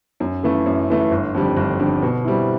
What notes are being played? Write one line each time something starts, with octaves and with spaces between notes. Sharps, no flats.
F#2
C#3 E3 A3
F#2
C#3 E3 A3
G1
F2 D3 G3
G1
F2 D3 G3
B2
G3 C4 E4